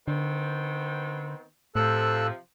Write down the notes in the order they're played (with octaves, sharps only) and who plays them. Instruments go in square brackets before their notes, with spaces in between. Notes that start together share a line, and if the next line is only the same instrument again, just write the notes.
[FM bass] D3 [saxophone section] D#3 B3 C4
[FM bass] A2 [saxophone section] C3 F3 [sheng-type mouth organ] A4 E6 F#6